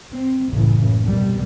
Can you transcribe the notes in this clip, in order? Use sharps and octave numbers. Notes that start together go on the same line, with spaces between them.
C4
F#1 C#2 A2 C#3 E3
C2 B2 G3